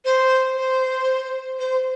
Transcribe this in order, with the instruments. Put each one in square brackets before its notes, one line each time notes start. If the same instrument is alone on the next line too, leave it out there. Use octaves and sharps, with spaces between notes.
[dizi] C5
C5
C5